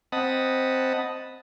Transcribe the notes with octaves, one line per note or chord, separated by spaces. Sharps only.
C4 D#5 F#5 A5 B5 D#6